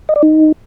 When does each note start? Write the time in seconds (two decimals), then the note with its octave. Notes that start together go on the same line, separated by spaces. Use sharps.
0.09 D#5
0.16 D5
0.23 D#4